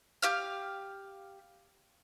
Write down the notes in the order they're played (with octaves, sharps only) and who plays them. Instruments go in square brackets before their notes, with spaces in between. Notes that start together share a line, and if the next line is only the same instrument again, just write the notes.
[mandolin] G4 F5 F6